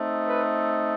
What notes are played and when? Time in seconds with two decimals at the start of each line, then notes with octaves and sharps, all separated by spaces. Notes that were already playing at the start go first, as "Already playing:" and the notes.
Already playing: A3 C4 D#4
0.26 B4